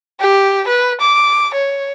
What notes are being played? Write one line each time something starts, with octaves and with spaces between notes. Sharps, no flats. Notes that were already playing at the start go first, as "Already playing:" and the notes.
G4
B4
D6
C#5